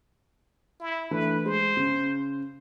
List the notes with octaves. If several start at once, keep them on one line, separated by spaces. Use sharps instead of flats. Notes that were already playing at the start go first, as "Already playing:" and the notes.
E4
E3 A3 D4 B4
G#3 C5
C#3